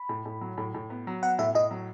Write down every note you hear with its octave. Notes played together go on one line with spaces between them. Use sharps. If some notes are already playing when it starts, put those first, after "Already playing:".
Already playing: B5
A2
A2
F#3
A2
A2
B3
F#3
B3 F#5
A2 E5
A2 D#5
F#3